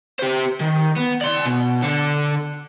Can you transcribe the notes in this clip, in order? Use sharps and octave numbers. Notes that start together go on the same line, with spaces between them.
G4 C5
D#3
B3
D5 C6
B2
D3 A4